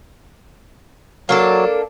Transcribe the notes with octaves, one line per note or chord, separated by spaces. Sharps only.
F#3 A#3 D4 A4